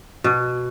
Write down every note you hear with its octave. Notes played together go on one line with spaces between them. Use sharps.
B2